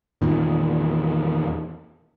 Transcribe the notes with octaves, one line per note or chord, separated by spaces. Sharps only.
E2 A#2 D#3